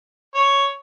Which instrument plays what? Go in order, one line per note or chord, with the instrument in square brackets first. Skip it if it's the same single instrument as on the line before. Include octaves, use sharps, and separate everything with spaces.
[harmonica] C#5